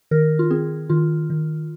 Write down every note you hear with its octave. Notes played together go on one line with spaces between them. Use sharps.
D#3 A#4
F4
C4 G#4
D#3 F4
D#3